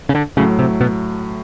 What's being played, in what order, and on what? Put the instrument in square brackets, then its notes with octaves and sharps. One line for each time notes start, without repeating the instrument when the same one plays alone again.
[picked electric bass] C#3
D3
[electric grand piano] A2 F#3 A3 [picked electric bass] C#3
[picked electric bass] C3
B2